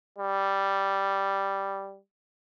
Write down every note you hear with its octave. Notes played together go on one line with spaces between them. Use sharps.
G3